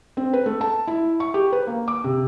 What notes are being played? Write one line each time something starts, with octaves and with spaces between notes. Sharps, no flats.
C4
B4
A3
A5
E4
C#6
G4
B4
A#3
D6
C3